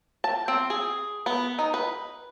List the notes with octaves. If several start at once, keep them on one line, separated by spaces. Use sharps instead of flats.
A5
C4
G#4
B3
D#4
B4